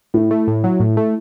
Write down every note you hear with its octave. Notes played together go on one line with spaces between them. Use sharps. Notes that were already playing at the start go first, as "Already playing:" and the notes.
A2 E4
A3
A2
F#3
A2
A3